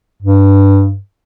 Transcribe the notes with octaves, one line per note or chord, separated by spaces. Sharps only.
G2